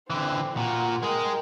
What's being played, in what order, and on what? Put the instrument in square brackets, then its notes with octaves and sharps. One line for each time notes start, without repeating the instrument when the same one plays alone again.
[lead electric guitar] D3 E3 [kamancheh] C4
[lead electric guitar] A#2 [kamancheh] F#4
[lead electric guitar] G#3 G#4 [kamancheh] A#4 G5